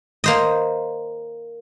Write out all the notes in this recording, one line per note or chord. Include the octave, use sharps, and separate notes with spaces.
A#3 C5 D#5